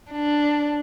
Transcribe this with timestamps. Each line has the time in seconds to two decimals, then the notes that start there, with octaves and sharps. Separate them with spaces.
0.11 D4